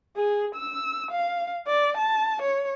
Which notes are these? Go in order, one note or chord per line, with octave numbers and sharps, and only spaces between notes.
G#4
E6
F5
D5
A5
C#5